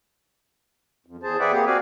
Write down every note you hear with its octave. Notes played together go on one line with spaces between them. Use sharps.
F2
E2 G#4 C5 A5
G#4 B4 D5 E5 F#5 G5
A#3 C4 G4 G#4
C4 F#4 D5 F5 G#5